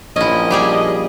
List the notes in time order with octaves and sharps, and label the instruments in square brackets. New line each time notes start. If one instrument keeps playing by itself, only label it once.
[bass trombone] A#1 [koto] C#4 E4 [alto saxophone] D#5
[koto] G3 G4 G#4